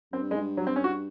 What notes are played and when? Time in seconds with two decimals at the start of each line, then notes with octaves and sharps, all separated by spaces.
0.13 F#2 C4
0.21 G2
0.31 F#2 G#3
0.35 G#2
0.40 G2
0.57 F#3
0.67 C4
0.76 C#4
0.84 F#4